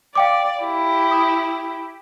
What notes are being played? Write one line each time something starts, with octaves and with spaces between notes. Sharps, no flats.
D5 F5 G5 D6
E4 G4
D#6